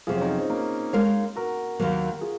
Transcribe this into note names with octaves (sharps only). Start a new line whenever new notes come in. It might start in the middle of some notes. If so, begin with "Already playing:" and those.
F2 C3 F#3 F4 G#4
C#4
C4 D#4
C4
A#3 C#4
G#3 D#4 A#4 C#5 F5
F#4 A#4
D#2 D#3 F#3 A#3
F4 G#4